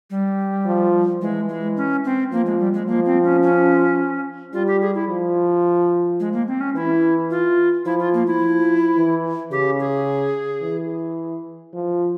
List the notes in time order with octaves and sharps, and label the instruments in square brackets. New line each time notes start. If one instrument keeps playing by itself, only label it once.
[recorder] G3
[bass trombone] F3
[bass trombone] E3 [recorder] G#3
[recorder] G#3
C#4
C4
[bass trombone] F3 [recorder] A#3
[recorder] G#3
G3
G#3
[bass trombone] F3 [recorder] A#3
[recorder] C4
C#4
C#4
[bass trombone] G3 [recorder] F4
[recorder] G4
G#4
E4
[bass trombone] F3
[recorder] G#3
A#3
C4
C#4
[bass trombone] E3 [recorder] E4
[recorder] F4
[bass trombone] F3 [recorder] E4
[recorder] F4
A#3
E4
[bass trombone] F3
E3
[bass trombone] C#3 [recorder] G4
[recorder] G#4
[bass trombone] E3
F3